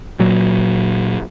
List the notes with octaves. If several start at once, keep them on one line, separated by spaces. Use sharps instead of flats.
A#2 F#3